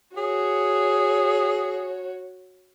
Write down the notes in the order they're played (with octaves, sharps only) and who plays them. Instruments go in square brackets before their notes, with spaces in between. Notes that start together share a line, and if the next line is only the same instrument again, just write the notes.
[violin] F#4 C#5 [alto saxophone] G#4